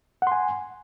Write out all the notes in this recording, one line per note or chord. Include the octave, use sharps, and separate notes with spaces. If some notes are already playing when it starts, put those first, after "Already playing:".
F#5 G#5 C6